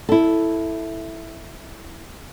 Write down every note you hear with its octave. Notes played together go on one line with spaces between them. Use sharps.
E4 A4